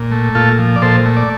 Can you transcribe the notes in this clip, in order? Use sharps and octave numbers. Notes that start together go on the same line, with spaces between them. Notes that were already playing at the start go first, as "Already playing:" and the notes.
Already playing: A#2
A3
A#2 F4 A4
F3
D5
A#2 A4 C5
A3
D5